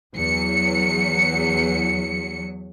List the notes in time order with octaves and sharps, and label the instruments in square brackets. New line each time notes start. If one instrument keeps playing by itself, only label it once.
[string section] E2 F#3 C#7